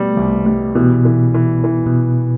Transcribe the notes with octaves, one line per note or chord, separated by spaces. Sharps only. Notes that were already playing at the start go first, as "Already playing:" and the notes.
Already playing: B2 G3 A3 B3
C2
G3
B2 E3
E3
E3
E3
B2